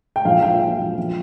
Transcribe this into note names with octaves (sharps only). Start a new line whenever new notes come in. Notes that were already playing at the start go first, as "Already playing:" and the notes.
G5
A#1 F5
A#1 G5
A#1
A#1
A#1